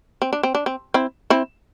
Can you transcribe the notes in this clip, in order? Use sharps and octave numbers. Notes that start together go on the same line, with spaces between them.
C4
D4
C4
D4
C4
C4 E4
C4 E4